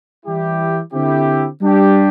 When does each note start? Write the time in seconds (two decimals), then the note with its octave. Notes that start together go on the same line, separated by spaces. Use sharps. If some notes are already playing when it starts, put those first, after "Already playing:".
0.26 E3 G3 E4 G4
0.93 D3 C4 E4 G4
1.61 G3 D4 G4